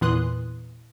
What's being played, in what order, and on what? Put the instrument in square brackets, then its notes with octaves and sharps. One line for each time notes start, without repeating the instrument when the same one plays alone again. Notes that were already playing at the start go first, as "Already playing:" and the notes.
[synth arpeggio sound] E2 A#2 E3 C6 D#6 F#6